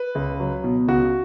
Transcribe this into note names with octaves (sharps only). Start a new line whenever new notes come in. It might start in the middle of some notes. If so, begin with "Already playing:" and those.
Already playing: B4
C#2
F#3
B2
C#2 F#4